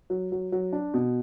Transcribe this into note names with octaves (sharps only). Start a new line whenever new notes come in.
F#3
F#3
F#3
D4
B2